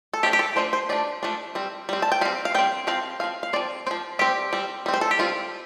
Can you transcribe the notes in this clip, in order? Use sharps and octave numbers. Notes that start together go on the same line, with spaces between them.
A4
F3 A3 D4 G4
G4
A4
F3 A3 D4 C5
C5
F3 A3 D4 D5
F3 A3 D4
G3 C4
G3 C4
A5
G5
G3 C4 F5
F5
G3 C4 G5
F3 C4 F5
F3 C4 F5
F5
F3 C4 D5
F3 C4 C5
G3 C4 G4
G3 C4
G3 C4
C5
A4
G4
G3 C4 F4